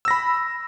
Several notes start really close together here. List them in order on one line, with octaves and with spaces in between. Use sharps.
E6 A#6 B5